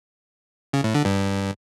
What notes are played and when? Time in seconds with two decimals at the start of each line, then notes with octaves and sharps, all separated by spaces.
0.73 C#3
0.84 A2
0.95 D3
1.05 G2